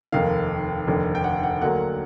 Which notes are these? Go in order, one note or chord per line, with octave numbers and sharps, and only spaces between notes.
F1 D#2 D#3 F5
F1 D#2 D3
G5
F#5
F#5
D2 D3 F#3 A#3 F#5